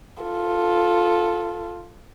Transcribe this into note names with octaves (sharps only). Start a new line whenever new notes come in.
F4 A4